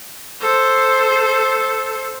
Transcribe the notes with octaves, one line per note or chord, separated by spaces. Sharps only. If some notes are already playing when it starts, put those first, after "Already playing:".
A4 C5